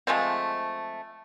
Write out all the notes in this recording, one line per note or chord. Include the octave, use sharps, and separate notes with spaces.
F3 G#3 A3 C4